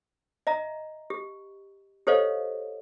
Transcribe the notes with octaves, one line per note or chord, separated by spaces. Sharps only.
D#5 E5 A#5
G4
G4 A4 C5 C#5 D#5 F5